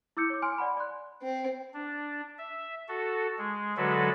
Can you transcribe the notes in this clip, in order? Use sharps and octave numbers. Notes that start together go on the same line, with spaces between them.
E4 D6 E6 G6 C#7
C#5 D6
G#5 C6 F6 D7
D5 F#5 B5
D5 C6 F#6
C4
D4
E5
F#4 A4
G#3
D3 F#3 G#3 F#4 A4 B4